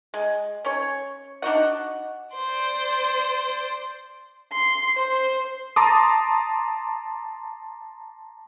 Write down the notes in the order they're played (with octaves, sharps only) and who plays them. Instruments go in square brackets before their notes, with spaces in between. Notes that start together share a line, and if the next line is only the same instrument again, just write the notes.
[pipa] G#3
C#4 C#5
D4 D#4 F#4 F#5
[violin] C5 D5
[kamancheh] C6
C5
[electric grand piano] A5 A#5 C6 D6 D#6